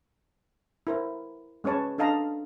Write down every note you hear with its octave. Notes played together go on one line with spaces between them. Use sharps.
E4 A#4 C5
G#3 C#4 B4 C#5 A5
D4 A4 D#5 F5 A5 A#5